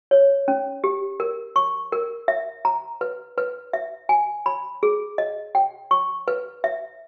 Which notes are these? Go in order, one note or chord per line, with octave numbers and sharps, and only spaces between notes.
C#5
C#4
G4
A#4
C#6
A#4
E5
A#5
B4
B4
E5
G#5
B5
G#4
D#5
G5
C#6
B4
E5